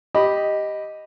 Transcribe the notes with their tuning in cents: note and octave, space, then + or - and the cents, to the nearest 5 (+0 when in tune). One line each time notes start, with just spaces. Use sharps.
G4 +0 D#5 +0 B5 +0